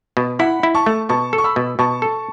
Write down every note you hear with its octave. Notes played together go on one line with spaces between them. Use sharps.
B2
E4 F#5 B5
E4
A5 C#6
A3
B2 A5 C#6
A4
C#6
B5 E6
B2
B2 A5 C#6
A4